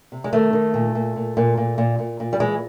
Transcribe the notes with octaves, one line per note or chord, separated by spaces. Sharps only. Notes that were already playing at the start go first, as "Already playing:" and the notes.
C3
G#3
D#3 A3
D#3
A#2
A#2
A#2
A#2
A#2
A#2
A#2
A#2
G3
E3 G#3